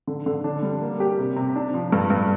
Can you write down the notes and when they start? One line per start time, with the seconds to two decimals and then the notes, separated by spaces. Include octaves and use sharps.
0.07 D3
0.26 D3
0.44 D4
0.63 G3
0.82 A#3
1.00 G4
1.19 C3
1.36 C3
1.56 D4
1.74 F3
1.92 G2
2.10 G2